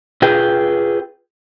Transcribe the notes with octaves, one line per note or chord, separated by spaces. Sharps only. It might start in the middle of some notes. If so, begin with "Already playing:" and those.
F4 G#4 B4 G5